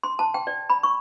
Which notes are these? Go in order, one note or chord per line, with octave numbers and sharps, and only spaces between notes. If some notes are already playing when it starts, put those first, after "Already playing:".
C6
A5
G5
D5
B5
C#6